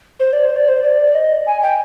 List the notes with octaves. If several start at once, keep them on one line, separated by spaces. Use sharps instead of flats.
C5
D5
C5
D5
C5
D5
D5
D#5
G#5
G5